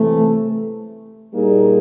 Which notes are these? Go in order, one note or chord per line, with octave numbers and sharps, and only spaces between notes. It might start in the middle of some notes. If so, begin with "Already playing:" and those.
Already playing: C3 E3 A3
A#2 G3 A#3 D#4 G#4